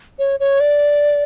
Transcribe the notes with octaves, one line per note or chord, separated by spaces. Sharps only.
C#5
C#5
D5